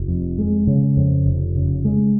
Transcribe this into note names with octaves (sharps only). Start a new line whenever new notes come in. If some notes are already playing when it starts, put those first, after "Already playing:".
Already playing: F1
F2
G#3
C#3
F2
F1
C#3
G#3